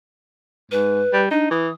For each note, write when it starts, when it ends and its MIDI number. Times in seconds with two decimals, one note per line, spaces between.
0.71 1.03 44
0.71 1.21 71
1.13 1.29 55
1.31 1.49 62
1.31 1.48 63
1.51 1.69 52
1.51 1.73 87